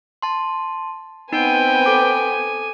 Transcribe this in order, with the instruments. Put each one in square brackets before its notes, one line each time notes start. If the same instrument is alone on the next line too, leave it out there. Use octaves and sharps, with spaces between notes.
[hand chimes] A5 C6
[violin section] B3 C4 [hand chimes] D#4 [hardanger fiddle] G5 [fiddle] G#5
[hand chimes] A4 D6